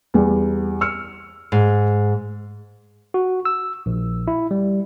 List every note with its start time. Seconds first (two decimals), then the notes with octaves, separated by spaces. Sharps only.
0.14 E2 G3
0.81 E6 F6 C#7
1.52 G#2
3.14 F#4
3.45 E6
3.86 A#1
4.28 E4
4.51 G3